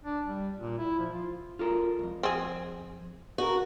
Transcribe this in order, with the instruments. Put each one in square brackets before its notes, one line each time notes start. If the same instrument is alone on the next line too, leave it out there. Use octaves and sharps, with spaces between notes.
[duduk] D4
G3
A#2
E4
F3
F4
[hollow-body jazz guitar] F4 A4 A#4
C2 F2
[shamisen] C4 G#4
[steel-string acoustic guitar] F#4 [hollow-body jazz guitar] G#4 A#4